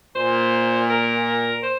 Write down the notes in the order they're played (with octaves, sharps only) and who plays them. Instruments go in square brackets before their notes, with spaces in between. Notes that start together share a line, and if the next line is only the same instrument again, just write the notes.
[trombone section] A#2 [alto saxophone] C5
[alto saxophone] A#4
C5